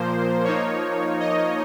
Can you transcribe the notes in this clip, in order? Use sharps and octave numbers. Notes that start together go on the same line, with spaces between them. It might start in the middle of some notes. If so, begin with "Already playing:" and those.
Already playing: A#2 F3 A#3 C5
F3 A#3 D#4 C#5
D#5